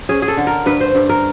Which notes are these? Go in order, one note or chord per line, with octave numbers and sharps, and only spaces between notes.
C#4 G#4
G#4
A4
D3
A#4
G2 B4
C5
G2
A#4